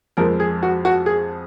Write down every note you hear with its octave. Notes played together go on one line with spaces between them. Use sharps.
F2 F3 G#3 A#4
G#4
F#4
F#4
G#4